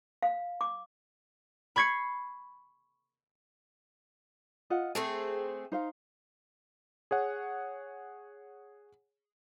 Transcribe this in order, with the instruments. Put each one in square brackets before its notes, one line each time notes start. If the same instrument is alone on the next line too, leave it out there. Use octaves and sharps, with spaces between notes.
[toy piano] F5
D6
[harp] B5 C#6 G#6 C7 C#7
[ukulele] F4 D#5 F#5
[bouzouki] A3 C4 G#4 [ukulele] A4
[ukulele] D#4 C5 F5
[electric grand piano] G#4 C#5 F#5